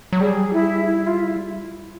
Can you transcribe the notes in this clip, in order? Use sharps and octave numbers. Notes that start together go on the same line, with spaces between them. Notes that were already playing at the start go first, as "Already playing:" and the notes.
F#3
G3 G#4
E4
E4
F4
E4